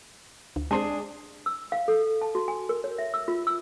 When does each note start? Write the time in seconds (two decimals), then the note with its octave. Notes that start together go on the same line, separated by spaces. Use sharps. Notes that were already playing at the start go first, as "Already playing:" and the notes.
0.56 D2
0.71 G#3 C4 D4 G#4 C5
1.46 E6
1.72 F5
1.88 A4
2.22 A5
2.35 F#4
2.48 G#5
2.69 A#4
2.84 C#5
2.98 E5
3.14 E6
3.28 F4
3.47 E6